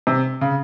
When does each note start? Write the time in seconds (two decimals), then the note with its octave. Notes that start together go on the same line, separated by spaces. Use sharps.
0.07 C3
0.41 C#3